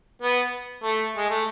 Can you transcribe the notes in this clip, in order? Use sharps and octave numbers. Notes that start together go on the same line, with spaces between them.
B3
A3
G#3
A3